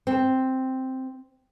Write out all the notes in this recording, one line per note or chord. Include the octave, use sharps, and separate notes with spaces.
C4